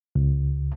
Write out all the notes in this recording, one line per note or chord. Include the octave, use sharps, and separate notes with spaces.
C#2